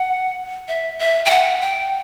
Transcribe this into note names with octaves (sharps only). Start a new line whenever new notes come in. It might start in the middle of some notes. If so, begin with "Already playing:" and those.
Already playing: F#5
E5
E5
G5
F#5
G5